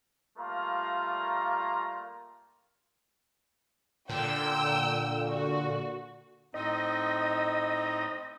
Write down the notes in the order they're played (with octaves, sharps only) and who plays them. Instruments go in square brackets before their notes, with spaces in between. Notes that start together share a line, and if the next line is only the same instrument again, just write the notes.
[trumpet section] G3 A3 A#3 F4 A#4 A#5
[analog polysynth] A#2 D3 [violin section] G5 E6
[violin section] F#4
[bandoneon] A2 C4 D#4 [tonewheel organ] D#5